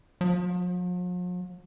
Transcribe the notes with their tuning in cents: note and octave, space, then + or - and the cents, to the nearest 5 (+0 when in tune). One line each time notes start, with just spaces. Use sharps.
F3 +45